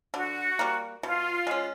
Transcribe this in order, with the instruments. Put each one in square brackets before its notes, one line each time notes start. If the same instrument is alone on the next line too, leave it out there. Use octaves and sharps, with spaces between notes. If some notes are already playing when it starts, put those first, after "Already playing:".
[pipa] D3 [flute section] F#4
[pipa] G3 A#3
[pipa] B2 [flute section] F4
[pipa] G#3 C#4